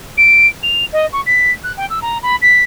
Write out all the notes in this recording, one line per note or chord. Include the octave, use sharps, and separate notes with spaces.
D7
F7
D#5
C#6
B6
F#6
G5
E6
A#5
B5
B6